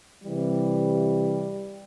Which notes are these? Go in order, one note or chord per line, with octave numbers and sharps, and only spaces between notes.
C3 E3 G3